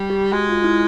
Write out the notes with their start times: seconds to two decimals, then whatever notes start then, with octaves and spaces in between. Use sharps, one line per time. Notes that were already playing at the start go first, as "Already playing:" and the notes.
Already playing: G3
0.10 G4
0.33 G#3 F#4
0.49 F4
0.64 E4